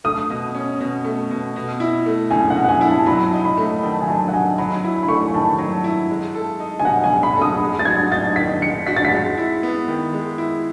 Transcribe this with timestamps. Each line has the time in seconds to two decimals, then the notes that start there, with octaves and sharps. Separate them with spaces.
0.04 A3 D#6
0.30 B2
0.55 C#4
0.80 B2
1.04 A3
1.31 B2
1.56 B2
1.80 E4
2.06 A3
2.31 C#2 G#5
2.50 F#5
2.56 B2
2.64 F#5
2.69 G#5
2.81 E4
2.88 A5
3.06 F#3 B5
3.33 D#4
3.45 B5
3.57 A3
3.83 D#3 A5
4.02 G#5
4.07 F#3 A5
4.29 F#5
4.33 D#4 G#5
4.58 F#3 B5
4.83 E4 B5
5.03 B5
5.08 A3 C#6
5.27 G#5
5.34 D#3 A5
5.58 F#3
5.84 E4
6.10 G#3
6.35 A4
6.60 D#4
6.79 G#5
6.85 B2 F#5
7.04 G#5
7.11 G#3
7.23 B5
7.36 A4
7.42 D#6
7.60 G#3
7.79 A6
7.85 F#4 G#6
8.12 D#4 A6
8.36 D#3 B6
8.61 G#3 C#7
8.87 F#4 B6
8.96 A6
9.05 B6
9.12 G#3
9.38 E4
9.63 B3
9.88 D#3
10.13 G#3
10.38 E4